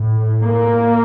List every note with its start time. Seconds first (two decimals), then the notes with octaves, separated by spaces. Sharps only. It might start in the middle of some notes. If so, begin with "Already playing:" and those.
Already playing: A2
0.43 A#3